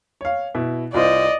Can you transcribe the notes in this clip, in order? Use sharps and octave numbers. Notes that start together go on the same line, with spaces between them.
C#5 F5
B2 E4
C2 F4 C5 D5 D#5